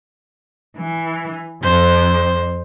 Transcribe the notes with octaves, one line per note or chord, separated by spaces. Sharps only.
E3
F2 C5